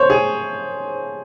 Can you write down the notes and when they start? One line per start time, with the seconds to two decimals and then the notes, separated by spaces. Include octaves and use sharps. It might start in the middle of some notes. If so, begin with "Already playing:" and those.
Already playing: C5 C#5
0.10 G#4